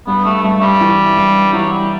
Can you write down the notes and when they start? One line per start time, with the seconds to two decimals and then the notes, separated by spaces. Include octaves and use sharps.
0.07 G2 B3
0.25 A3
0.43 G2 A3
0.62 G3
0.81 E3
1.17 G2
1.53 E3 F#3
1.72 G3